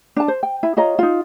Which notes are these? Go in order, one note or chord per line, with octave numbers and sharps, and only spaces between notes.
D4 A5
C5
G5
E4
F4 C#5 D#5 A#5
D#4 F4